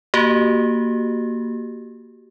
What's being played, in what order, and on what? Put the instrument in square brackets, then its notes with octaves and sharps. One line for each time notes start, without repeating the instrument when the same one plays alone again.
[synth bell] A#3 F#4 G4